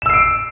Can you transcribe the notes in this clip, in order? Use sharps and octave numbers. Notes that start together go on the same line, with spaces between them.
E6 C7 D7 E7